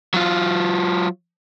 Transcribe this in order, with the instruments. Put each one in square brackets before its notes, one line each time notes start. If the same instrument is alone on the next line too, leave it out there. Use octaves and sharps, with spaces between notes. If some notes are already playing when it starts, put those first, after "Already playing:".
[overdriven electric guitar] F#3 F4